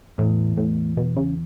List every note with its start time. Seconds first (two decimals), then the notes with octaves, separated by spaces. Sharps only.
0.18 E2 A2
0.57 A2
0.97 B2
1.16 C#3